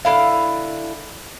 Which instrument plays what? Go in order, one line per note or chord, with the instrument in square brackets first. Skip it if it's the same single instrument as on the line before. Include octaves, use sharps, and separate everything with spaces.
[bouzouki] D3 E4 F5